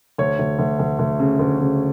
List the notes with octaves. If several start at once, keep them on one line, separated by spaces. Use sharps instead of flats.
D2 C#5
D2
D2
D2
D2
C#3
D2
C#3